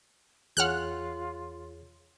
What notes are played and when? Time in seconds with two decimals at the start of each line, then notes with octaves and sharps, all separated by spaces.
0.57 E2 F4 G#4 C#5 F#5 F6 F#6